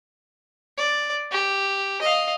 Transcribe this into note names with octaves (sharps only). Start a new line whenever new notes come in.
D5
G4
D#5 F5